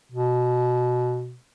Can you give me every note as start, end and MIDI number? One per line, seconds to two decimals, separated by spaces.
0.12 1.36 47